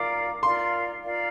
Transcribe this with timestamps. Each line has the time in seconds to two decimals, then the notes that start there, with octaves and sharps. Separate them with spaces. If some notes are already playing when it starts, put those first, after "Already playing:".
Already playing: F4 A#4 D5 F5 D6
0.43 F4 A#4 D5 F5 C6
1.03 F4 A#4 D5 F5